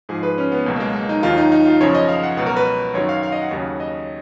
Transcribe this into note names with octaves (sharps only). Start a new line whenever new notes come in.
G#2 F3 G#4
B4
C#4
B3
C#2 B2 F#3 A#3
A#3
G#3
A#3
D#4
D#2 D#3 F#3 F4
D#4
D#4
F4
F#2 C#3 F3 C#5
D#5
F5
F#5
C#2 B2 F#3 F#5
A#4
B4
F#2 D#3 F#3 C#5
F5
F5
D#5
F#5
D#2 C#3 F#3
D#5